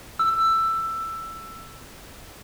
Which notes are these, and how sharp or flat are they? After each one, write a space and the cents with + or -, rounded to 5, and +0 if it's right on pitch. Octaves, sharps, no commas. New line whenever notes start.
E6 +10